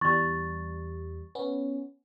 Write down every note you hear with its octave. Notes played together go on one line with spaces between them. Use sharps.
E2 G3 C#6 A6
B3 C#4